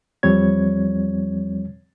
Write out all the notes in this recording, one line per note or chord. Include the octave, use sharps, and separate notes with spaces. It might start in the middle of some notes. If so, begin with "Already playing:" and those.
E2 F3 G3 C4 C#5 G#6